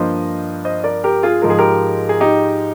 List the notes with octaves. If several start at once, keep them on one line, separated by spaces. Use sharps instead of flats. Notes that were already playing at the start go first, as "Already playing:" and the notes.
Already playing: G2 F3 A#3 C5 D#5
C5 D#5
A#4 D5
G4 A#4
F4 G#4
G#2 F3 G#3 A#4
G#4
G4 A#4
G#4
D#4 G4